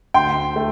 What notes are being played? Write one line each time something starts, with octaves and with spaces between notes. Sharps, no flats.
D2 G5 C6
A3